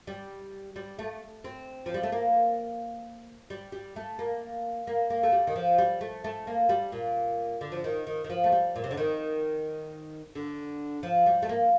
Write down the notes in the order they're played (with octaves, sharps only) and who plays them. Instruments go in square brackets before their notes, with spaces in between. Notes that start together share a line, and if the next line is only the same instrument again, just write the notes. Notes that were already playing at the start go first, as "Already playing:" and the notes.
[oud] G3
G3
A3
C4
F3
G3
A3
A#3
G3
G3
A3
A#3
A#3
A#3
A3
G3
D#3
F3
G3
A3
A3
A#3
G3
A#2
D3
F3
D#3
D#3
D#3
F3
A3
G3
A#2
C3
D3
D#3
D3
F3
G3
A3
A#3